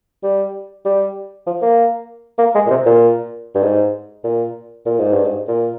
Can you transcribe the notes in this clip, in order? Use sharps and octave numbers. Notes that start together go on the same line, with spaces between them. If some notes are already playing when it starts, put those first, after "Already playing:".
G3
G3
F3
A#3
A#3
G#3
A#2
C3
A#2
G2
G#2
A#2
A#2
G#2
G2
G#2
A#2